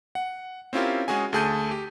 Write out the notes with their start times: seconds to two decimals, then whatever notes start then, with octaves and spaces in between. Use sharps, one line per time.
0.15 F#5
0.73 C4 C#4 E4 F4 G4 A#4
1.08 G#3 C#4 F#4 G#4 G#5
1.33 D2 A3 G#4 A5 G6 D#7
1.71 G4